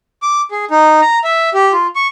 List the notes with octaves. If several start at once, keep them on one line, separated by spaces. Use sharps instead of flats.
D6
G#4
D#4
A#5
E5
G4
F4
C#6